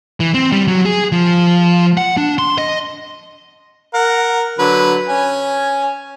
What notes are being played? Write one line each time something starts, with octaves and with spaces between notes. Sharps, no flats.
E3
C4
G3
F#3
G#4
F3
F#5
D4
C6
D#5
A#4 F#5
D3 F#3 B4
C#4 G#5